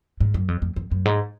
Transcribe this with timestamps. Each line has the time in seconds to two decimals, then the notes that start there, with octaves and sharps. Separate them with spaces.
0.20 G#2
0.34 F#2
0.48 F2
0.62 F2
0.76 F2
0.91 F#2
1.05 G#2